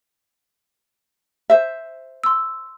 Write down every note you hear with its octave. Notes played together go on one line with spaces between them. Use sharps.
C5 E5
C6 E6